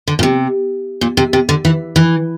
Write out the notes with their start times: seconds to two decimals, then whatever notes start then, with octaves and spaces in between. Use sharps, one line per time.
0.08 D3
0.19 A#2
0.23 C3
1.01 A#2
1.17 C3
1.33 C3
1.49 D3
1.65 E3
1.96 E3